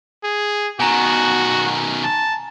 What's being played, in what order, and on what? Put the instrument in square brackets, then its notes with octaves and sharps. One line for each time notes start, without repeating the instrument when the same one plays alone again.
[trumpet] G#4
[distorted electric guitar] B2 D#3 [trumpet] F#4 [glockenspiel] G#5 A#5
[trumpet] A5